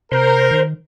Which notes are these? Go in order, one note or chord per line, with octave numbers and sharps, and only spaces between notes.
C3 A#4 C5
D#3